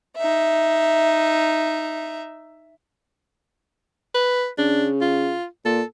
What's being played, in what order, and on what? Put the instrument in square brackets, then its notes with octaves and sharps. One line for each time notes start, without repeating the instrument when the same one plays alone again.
[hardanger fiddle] D#4 E5
[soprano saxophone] B4
[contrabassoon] C#3 [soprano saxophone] D4
[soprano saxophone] F4
[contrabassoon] A#2 [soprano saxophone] A4